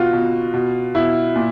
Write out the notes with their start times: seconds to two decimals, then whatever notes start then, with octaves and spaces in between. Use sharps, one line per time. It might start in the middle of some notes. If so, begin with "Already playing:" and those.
Already playing: B2 F4 F#4
0.13 B2
0.54 B2
0.95 B2 E4
1.36 A#2